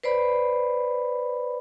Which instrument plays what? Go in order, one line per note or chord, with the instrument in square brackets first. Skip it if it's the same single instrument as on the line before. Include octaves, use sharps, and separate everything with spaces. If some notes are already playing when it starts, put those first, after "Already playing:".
[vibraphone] B4 C5 D5 B5